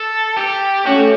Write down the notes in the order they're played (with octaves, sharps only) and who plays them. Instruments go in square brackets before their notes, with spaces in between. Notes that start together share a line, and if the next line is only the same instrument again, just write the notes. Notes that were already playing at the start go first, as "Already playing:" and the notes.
Already playing: [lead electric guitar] A4
G4
[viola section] A3 C#4 [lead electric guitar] F#4